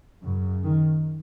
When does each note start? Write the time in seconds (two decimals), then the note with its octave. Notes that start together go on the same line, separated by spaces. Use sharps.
0.25 F#2 C#3
0.64 D#3